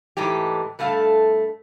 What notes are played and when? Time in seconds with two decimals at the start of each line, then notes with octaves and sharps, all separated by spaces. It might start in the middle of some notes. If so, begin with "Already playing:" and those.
0.17 G#2 E3 G#3 A3 G4
0.79 G2 A3 A4 F5